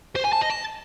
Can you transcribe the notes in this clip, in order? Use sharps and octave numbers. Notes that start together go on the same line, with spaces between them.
C5
G#5
A5
D#5
A5